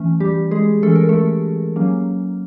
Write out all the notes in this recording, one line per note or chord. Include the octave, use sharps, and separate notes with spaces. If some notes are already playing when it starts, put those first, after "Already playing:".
Already playing: E3 A3 C#4
G3 G4
G#3 G#4
E3 A3 C#4 A4
A#4
A3 A4
F#3 A#3 C#4